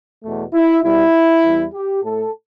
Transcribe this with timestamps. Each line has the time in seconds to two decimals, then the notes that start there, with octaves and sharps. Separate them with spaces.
0.23 E2 B2 A3
0.54 E4
0.83 B2 G3 E4
1.43 E2 E3 G3
1.74 G4
2.04 A2 A3 A4